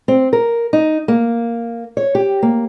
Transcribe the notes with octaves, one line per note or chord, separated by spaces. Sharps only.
C4
A#4
D#4
A#3
C#5
G4
A#3